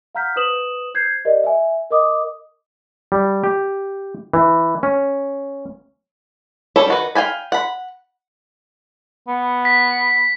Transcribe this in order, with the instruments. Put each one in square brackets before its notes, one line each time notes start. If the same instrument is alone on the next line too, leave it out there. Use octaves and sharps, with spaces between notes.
[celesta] F5 F#5 A#5 F6 G6 B6
B4 C5 D#6 E7 F#7
C5 G6 G#6 C7
G4 A#4 C5 D5 D#5
E5 G#5
A#4 D#5 D6 D#6
[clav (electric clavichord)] G3
G4
E3
C#4
[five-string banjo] G3 C#4 A4 C#5 B5
D#3 F#4 B4
F5 G5 G#5 B5
F#5 B5
[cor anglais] B3
[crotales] B6